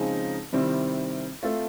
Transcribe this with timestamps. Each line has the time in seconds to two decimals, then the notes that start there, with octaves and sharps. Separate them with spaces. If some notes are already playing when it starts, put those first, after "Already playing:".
Already playing: C#3 F3 G#3 C4 D#4
0.53 C3 D#3 G3 C4 E4
1.43 A3 C4 F4 A4 C5